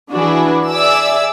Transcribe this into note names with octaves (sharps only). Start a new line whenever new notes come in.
E3 D4 E4 F#4 G#4 B4
G#4 D5 E5 D6 E6